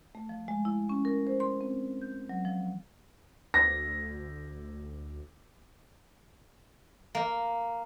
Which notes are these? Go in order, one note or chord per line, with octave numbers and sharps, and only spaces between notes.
A3
F3
G#3
E4
C#4
A#4
C5
C6
C4
G6
F#3
F3
D2 A#6
A#3